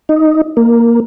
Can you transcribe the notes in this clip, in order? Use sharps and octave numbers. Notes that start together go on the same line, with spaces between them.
D#4
A#3